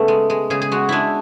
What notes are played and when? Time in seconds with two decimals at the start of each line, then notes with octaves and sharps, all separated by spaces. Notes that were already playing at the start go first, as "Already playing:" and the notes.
Already playing: C#3 A3 B3 C#4
0.08 G#3
0.30 G#3
0.50 C#3 G#4
0.62 G#4
0.72 G#3 F#4
0.89 G#3 D4 E4